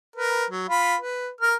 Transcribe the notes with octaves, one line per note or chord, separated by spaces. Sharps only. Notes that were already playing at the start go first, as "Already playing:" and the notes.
A#4 B4
F#3
F4 B5
B4
A#4 F6